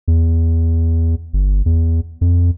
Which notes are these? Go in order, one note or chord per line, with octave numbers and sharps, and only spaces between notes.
E2
G1
E2
F2